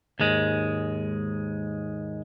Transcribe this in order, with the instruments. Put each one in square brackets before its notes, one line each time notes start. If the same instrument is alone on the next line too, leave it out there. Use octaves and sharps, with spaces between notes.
[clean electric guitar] D#2 G#2 G#3